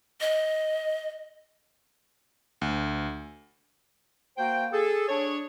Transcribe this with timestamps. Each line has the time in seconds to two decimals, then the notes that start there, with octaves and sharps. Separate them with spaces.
0.21 D#5
2.61 D2
4.38 A#3 F#4 C5 G5
4.73 G#4 A4
5.08 D4 G#4 C#5